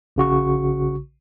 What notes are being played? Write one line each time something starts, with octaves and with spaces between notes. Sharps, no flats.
A#1 C#3 F#4 C#6